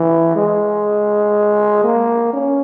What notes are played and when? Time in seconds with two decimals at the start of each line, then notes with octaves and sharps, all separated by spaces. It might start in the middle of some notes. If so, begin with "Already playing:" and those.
Already playing: E3
0.36 G#3
1.84 A#3
2.33 C#4